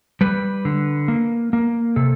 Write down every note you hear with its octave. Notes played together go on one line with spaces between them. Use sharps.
G3 B4
D3
A#3
A#3
C3 A4